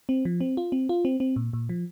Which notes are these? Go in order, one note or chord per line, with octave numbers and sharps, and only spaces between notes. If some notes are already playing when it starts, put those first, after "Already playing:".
C4
F3
C4
F4
C4
F4
C4
C4
A#2
A#2
F3